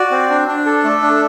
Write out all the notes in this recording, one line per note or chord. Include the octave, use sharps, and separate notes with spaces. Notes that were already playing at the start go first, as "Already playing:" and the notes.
Already playing: F#4 D5
C4
D4
D4
A4
A3
D4